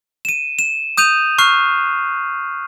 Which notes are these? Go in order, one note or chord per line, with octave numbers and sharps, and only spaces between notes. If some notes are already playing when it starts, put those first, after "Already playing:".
D#7 E7
E7
D#6 G6 D#7 F7
C#6 F6 F#6 C7